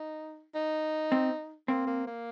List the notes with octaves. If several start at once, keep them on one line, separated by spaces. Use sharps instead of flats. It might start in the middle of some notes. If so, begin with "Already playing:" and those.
Already playing: D#4
D#4
C4
A#3 C4
A#3
A#3